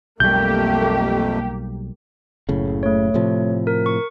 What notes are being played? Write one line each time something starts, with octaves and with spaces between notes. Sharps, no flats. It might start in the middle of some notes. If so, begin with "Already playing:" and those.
B1 F2 G3 A3 A#3 G4 G6
F#1 A2 C#3
A3 C#5
A2 C3 F3
A#4
C#6